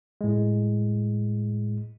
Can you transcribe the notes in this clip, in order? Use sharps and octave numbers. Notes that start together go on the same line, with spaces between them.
A2 G#3